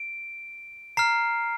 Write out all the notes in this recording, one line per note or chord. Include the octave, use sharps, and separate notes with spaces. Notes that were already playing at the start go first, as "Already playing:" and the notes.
Already playing: D7
A#5 F6 C7